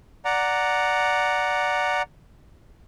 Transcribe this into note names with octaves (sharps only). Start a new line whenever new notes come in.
D5 F#5 A#5